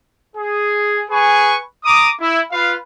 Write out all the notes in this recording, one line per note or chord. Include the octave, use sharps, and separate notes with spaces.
G#4
G#4 B4 G#5 C#6
A#5 D6 D#6
E4
F4 B4 F5